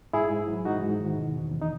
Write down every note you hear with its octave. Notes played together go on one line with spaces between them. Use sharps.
G#2 E4 G#4
G#2
F#3
G#2 D#4 F#4
G#2
D#3
B2
E2
E2
D#4